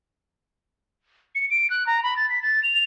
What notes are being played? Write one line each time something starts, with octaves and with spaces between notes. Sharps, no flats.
C#7
D7
F#6
A#5
B5
A6
B6
A6
F7